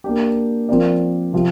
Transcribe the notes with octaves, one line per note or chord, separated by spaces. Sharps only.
A#3 D4 G4
F3 C4 A#4 D5
C3 F3